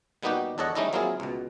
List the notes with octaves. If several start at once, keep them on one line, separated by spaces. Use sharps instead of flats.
A#2 G3 B3 D#4 F#4 G4
E2 D4 A4 C#5 D#5 F#5
G3 A3 C#4 D#4 E4 D#5
F#3 A#3 C4 E4 F4 G#4
C#2 B2